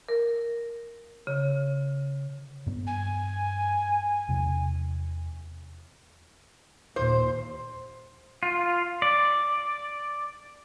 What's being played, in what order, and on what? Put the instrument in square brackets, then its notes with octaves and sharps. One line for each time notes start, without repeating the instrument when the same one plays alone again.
[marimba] A#4
C#3
[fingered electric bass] G2 B3
[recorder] G#5
[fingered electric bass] E2 C3
[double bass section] D#2 A#2 [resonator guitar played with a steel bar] C5
[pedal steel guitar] F4
D5